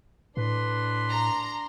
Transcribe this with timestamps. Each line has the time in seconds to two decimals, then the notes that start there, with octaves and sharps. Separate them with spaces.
0.37 A2 D4 B4 C6
1.10 A#5